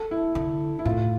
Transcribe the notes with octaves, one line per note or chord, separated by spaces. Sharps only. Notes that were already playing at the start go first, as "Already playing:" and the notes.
Already playing: A4
E4
D3
E4
A2 F4